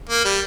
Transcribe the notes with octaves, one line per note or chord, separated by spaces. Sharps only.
A#3
G3